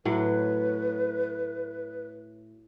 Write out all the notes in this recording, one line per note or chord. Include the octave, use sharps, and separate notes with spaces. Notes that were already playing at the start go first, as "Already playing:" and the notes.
A2 F#3 B4